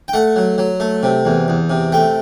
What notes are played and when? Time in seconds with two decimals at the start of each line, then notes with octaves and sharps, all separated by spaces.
0.08 G5
0.13 A3 F#5
0.36 F#3
0.58 F#3
0.80 A3
1.03 C3
1.25 E2
1.48 E2
1.70 C3
1.92 A3 G5